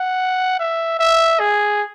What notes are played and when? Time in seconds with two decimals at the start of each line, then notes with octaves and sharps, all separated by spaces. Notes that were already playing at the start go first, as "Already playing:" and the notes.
Already playing: F#5
0.59 E5
0.99 E5
1.39 G#4